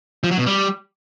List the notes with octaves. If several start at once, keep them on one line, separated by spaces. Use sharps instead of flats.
F3
F#3
B2
G3